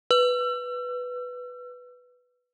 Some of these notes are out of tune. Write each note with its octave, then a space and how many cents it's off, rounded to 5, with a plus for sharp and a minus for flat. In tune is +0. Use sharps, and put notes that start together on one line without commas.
B4 +0 E6 +35